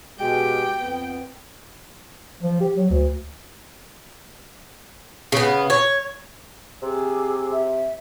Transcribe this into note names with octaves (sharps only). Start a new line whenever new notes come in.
B2 G#3 G4 G5
F2 B3
F3
G4
F#3
D2
C#3 B3
C#5
C3 G#4 D6 E6
E5